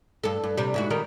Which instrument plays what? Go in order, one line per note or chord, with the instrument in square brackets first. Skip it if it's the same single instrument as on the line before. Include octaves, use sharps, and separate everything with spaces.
[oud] G2 A4
G2
C3 G3
G#2 E4 F#4
D#3 G3 A#4